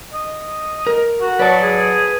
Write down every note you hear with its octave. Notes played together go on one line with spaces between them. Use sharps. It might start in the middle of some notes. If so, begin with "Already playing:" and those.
D#5
A#4
F#4
F#3 B4 D5 A5
G#4